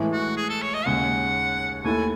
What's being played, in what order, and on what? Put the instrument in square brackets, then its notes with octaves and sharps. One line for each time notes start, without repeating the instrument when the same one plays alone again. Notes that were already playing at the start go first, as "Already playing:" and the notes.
Already playing: [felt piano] A2 E3 G#3
[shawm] F#4
G#4
A4
C#5
D#5
[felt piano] D#2 C#3 G#3 [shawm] F#5
[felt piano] D#2 D#3 A3 E4 A4 [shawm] G#5